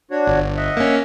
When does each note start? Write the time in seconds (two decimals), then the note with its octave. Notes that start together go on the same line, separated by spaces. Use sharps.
0.11 D4 F#4 C#5
0.27 G1
0.57 D#5 E5 F#5
0.77 A#3 C#4